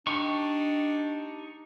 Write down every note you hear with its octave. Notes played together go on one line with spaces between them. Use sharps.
D4 D#4 G4 C#6